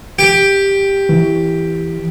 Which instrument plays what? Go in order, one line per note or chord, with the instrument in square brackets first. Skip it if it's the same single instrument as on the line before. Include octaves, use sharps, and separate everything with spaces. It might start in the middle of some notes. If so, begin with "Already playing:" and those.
[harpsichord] G4
[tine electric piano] E3